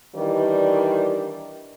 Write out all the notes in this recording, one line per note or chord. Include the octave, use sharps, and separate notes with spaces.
D#3 E3 G3 D4